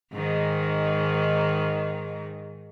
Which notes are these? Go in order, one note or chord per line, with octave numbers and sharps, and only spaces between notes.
G#2 D#3